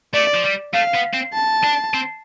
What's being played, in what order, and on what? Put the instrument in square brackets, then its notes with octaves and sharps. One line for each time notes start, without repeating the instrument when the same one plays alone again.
[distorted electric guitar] A3 [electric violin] D5
[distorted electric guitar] F3
G3
[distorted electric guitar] A3 [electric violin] F5
[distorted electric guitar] B3
C4
[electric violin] A5
[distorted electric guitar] D4
C4